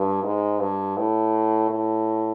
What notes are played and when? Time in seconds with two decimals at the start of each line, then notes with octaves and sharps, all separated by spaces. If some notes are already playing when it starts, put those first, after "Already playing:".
Already playing: G2
0.23 G#2
0.60 G2
0.98 A2
1.70 A2